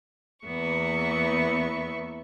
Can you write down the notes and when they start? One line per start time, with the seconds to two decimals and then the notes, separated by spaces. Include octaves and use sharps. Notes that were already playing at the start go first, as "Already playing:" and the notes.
0.45 E2 A#3 B3 E5 C#6